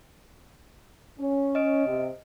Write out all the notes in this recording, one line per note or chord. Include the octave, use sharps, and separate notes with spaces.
C#4
D#5 F6 D7
C3